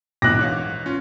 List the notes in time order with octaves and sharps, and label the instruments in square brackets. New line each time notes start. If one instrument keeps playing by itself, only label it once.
[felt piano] A#1 B2 E4 [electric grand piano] D#2 D#3 D6 [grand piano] F#6 A#6
[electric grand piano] G#2 C#5 F5 [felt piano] E3
[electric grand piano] C#4 F4